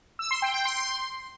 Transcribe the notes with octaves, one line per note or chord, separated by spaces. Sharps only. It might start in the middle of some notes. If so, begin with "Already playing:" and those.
E6
C6
G5
G5
C6